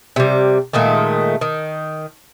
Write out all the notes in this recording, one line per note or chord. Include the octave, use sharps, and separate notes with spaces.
C3 G3
A#2 D#3 G#3 A3
D#3